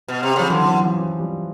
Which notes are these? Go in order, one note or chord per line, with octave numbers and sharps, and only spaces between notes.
B2
C3
C#3 F3
D3 E3 F#3
E3 F#3
F3
E3 F#3
F3 G3